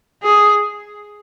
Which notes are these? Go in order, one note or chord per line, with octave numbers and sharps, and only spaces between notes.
G#4